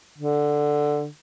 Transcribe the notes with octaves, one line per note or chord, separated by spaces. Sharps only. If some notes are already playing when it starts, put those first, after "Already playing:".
D3